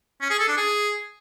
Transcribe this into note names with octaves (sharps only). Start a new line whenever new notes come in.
C#4
G#4
A4
D4
G#4